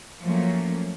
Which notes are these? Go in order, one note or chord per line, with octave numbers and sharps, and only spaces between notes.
F3 F#3 A3 A#3 C#4